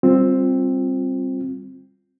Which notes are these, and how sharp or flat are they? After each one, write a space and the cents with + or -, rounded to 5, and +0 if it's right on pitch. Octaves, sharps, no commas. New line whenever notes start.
G3 +0 C4 +10 F4 +10